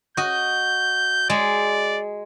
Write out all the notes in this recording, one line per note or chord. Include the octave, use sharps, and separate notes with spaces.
F#4 D#5 G6
G#3 D5